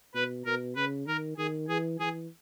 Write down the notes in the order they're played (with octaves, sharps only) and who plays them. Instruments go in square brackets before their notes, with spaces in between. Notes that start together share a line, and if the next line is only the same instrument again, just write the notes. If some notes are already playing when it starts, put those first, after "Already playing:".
[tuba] B2 [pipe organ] B4
[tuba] B2 [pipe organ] A#4
[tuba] C#3 [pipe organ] B4
[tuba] D#3 [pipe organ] A#4
[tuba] D#3 [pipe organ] G#4
[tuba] E3 [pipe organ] G#4
[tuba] E3 [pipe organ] G#4